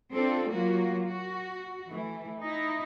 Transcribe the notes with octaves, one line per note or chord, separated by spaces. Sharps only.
C4 D4 F4 A4
F#3 A#3 F4 F#4
F#4
E3 A3
D#4 E4